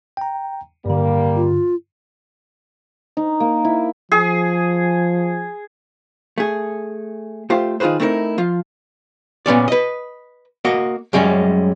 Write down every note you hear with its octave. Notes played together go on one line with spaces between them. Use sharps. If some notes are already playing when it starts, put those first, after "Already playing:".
G5 A#5
G2 D3 G3 A#3
F4
D#4
A#3
E4
F3 G#4
A3 G#4
A3 F4 G4 C5
D#3 D#4 F4 G#4 B4 C5
A3 C4 D#4 E4 A4 A#4
F3 F4
A#2 B3 C#4 D5
B4 D#5
A#3 F#4 D#5
F#2 G3 G#3 C#4